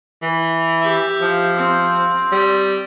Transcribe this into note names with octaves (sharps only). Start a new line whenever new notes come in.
E3
G4 E5
F3
C4
G3